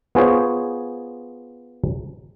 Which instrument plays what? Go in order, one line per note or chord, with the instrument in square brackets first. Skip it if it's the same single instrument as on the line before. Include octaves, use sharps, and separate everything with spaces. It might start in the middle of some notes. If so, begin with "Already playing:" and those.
[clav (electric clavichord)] B3 F4 G#4 C5 C#5